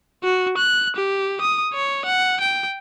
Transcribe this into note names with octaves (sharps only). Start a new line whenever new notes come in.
F#4
F#6
G4
D#6
C#5
F#5
G5